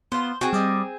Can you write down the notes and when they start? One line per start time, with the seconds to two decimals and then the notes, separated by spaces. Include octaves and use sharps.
0.12 B3 F4 C5
0.41 C4 F#4 G#4
0.53 G3 D5 D#5